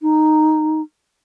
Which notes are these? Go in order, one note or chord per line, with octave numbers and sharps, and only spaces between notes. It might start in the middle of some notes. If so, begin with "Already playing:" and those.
D#4